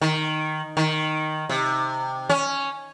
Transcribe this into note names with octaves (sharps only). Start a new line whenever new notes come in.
D#3
D#3
C3
C#4